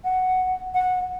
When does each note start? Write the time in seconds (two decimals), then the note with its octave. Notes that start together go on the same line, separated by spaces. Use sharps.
0.05 F#5
0.75 F#5